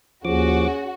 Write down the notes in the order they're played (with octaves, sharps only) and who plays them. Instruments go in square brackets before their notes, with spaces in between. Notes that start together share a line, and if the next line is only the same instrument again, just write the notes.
[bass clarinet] D#2 [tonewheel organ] F3 D6 [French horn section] C#4 G#4 [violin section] F#4